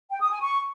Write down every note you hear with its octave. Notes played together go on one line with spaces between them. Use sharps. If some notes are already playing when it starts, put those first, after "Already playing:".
G5
D#6
G#5
C#6